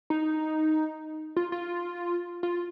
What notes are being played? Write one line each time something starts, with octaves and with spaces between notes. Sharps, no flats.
D#4
F4
F4
F4